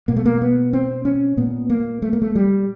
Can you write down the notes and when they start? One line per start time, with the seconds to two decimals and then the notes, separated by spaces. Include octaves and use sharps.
0.08 B2 A#3
0.16 A3
0.26 A#3
0.42 B3
0.73 C4
1.05 C#4
1.37 A#2 B3
1.70 A#3
2.02 A3
2.13 A#3
2.22 A3
2.35 G3